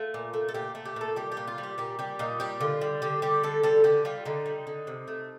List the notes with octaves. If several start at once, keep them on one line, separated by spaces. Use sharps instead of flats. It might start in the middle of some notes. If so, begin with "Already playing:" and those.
Already playing: A3 F4
A#2
A3
A4
A#2 G4
A3
G4
A#2 A4
G3 G4
G4
A#2
F4
G3
G4
A#2 G4
G3 G4
A#2 D#4
G3 G4
D3 F4
G3
D3 G4
G3 G4
D3 A4
G3 A4
D3 G4
G3 F4
D3 D#4
G3
D3
C3
A3